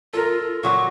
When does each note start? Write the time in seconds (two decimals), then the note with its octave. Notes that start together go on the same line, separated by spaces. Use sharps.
0.13 F4 A4 A#4
0.63 A#2 F#3 F#4 C#6